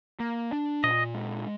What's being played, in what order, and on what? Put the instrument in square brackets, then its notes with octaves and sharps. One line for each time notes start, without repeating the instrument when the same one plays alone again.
[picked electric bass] A#3
D4
[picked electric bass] A#2 [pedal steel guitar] D#5
[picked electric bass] G#3